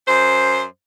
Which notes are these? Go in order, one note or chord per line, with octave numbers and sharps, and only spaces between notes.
F#2 C5